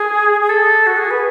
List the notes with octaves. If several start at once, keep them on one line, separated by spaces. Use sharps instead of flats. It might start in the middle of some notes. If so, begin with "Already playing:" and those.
Already playing: G#4
G#4
A4
F#4
G#4
B4